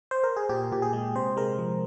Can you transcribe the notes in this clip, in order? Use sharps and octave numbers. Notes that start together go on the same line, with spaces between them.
C5
A#4
G#4
A#2 G4
A#2 G4
G#4
G#3
C3 C5
G#3 A#4
F3